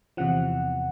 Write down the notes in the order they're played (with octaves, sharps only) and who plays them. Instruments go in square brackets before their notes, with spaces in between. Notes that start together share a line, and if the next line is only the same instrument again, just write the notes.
[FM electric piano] E2 C3 F3 F#5